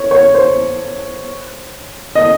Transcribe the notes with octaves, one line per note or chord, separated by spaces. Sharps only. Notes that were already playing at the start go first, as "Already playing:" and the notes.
Already playing: C#5
C#5
C5
D#5